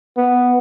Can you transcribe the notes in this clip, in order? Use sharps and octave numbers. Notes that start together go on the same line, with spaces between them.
B3